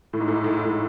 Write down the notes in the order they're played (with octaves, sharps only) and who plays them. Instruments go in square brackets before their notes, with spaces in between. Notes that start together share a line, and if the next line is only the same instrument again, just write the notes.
[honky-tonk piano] A2
G#2
A2
A2
A2